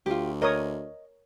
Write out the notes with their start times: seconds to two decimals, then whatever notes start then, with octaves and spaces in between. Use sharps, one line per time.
0.06 D2 F4 G4
0.42 A#4 C#5 D#5 D#6